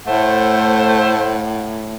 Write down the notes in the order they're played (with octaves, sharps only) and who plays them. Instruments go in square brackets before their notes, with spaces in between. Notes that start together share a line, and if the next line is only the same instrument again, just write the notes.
[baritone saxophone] A2 [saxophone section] A3 C5 [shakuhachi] F#5